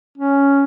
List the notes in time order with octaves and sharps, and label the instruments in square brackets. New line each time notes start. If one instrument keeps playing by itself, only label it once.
[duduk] C#4